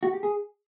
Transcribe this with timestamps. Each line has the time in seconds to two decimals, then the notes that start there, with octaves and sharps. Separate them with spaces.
0.03 F#4
0.13 G4
0.23 G#4